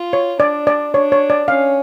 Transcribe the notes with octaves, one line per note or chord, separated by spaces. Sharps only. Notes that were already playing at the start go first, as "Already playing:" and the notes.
Already playing: F4
C#5
D4 D5
D5
D4 C#5
C#5
D5
C#4 F5